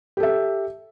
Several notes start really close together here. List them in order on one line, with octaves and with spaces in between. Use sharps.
G4 A4 E5